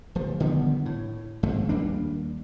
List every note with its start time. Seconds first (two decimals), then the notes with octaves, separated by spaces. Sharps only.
0.15 D1 F3
0.40 D3 D#3 G3 B3
0.86 A2
1.43 G#1 G#2 F3 A3
1.69 D#2 G3 A#3 D4